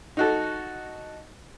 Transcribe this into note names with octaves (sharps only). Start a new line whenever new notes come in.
D#4 F#4 A4